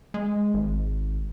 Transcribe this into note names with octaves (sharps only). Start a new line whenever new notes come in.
G#3
G#1